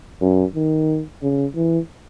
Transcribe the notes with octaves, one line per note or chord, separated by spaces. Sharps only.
F#2
D#3
C#3
E3